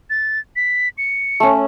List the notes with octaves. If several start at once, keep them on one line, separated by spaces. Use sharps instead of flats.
A6
B6
C#7
A3 C#4